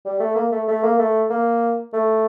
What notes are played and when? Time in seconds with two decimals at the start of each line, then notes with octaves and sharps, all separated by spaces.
0.05 G3
0.20 A3
0.36 A#3
0.52 A3
0.68 A3
0.84 A#3
0.99 A3
1.30 A#3
1.93 A3